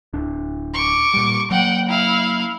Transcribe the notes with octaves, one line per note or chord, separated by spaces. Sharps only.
D1 D4
C#6 D6
A#2 G3
F#3 A#3 F#5 G5
E4 F5